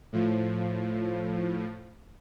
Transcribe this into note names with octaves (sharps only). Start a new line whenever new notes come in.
A2 F3